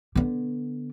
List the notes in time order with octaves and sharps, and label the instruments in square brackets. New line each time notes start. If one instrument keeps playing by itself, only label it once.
[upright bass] D3 B3